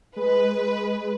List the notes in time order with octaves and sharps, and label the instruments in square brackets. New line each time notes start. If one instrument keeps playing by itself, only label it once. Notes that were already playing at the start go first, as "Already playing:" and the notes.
[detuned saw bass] G#3 [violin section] B4